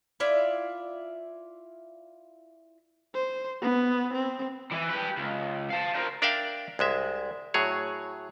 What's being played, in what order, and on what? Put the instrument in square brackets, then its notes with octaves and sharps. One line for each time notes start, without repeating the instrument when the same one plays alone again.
[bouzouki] E4 F4 D5 E5
[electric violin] C5
B3
C4
[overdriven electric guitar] E3
G4 B4
C#2
F5 A5
A#4 C5
[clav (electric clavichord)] D4 A#4 D5 E5 F5 G5
C2 G#3 E5
A2 F#3 G#4 C#5